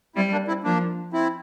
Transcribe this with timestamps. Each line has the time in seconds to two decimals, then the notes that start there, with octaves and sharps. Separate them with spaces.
0.16 G3 C4 E4
0.32 A#3 D4
0.48 C4 E4
0.64 F3 A#3 D4
1.13 C4 E4